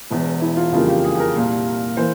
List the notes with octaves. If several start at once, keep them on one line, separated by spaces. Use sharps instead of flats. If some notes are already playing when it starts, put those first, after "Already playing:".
E1 E2 E3
E4
F4
F2 C#3 E3 G3 A#3 F4
G4
G#4
G#4
A#4
C2 A#2 G3
E3 A#3 C5